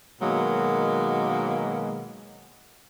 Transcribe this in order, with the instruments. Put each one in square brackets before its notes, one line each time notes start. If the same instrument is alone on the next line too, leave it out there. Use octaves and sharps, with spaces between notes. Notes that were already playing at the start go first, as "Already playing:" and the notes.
[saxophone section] B2 D#3 F#3 G#3 A#3